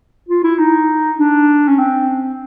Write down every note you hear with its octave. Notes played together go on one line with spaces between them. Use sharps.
F4
E4
D#4
D4
C#4
C4